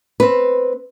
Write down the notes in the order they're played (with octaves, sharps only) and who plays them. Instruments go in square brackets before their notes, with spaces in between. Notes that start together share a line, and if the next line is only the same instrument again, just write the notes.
[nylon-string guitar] C4 B4